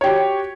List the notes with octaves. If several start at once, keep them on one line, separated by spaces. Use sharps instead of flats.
F#4 G4 C#5